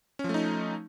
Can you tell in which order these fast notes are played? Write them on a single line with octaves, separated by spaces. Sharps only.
C#4 F3 A3 D#4